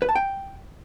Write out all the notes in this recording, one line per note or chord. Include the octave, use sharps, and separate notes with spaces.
B4
A5
G5